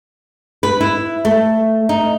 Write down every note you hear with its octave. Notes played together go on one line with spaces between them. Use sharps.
B4
E4
A3
D#4